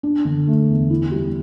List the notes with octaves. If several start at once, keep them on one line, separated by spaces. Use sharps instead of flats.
D4
D3
A3
E2
E4
G3